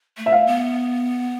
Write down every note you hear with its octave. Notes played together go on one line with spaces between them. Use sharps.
A3
E5
F5
B3